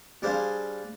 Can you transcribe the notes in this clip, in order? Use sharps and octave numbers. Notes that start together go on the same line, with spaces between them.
G3 D4 G#4 C5 F5